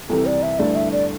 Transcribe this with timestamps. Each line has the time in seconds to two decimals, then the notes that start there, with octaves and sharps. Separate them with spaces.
0.10 C2 C3 E3 A4
0.26 D5
0.43 E5
0.59 G2 D3 A3 E4 D5
0.76 E5
0.91 D5